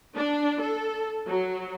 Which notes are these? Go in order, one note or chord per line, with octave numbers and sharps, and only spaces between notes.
D4
A4
F#3